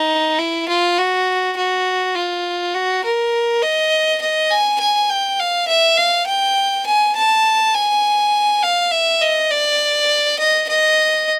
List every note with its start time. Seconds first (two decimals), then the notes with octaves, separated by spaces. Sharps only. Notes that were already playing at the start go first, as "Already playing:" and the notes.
Already playing: D#4
0.39 E4
0.68 F4
0.98 F#4
1.57 F#4
2.15 F4
2.74 F#4
3.04 A#4
3.62 D#5
4.21 D#5
4.50 G#5
4.80 G#5
5.09 G5
5.39 F5
5.68 E5
5.97 F5
6.27 G5
6.86 G#5
7.15 A5
7.75 G#5
8.63 F5
8.91 E5
9.21 D#5
9.51 D5
10.39 D#5
10.68 D#5